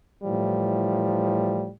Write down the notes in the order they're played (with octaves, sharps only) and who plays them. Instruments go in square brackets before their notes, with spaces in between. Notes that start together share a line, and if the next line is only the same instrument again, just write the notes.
[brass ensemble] A2 E3 F3 G3